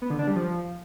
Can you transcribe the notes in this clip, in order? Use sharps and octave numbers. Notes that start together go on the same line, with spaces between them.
B3
D3
D4
G3
F3